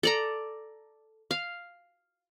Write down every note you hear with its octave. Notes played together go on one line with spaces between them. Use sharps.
A4 D5 A#5
F5